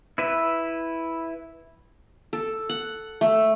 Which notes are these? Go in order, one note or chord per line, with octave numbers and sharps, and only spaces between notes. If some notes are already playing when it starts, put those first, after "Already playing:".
E4 B4 E5
A4
F#5
A3